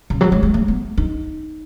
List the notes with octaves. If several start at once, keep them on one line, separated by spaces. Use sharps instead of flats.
C#3
F#3
G#3
G#3
A3
B3
D#4